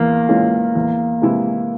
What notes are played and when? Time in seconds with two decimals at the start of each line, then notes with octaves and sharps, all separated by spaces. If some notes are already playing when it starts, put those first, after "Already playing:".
Already playing: E2 A#3
0.29 E3 G#3 C#4 F4
0.75 E2
1.22 C3 E3 G#3 E4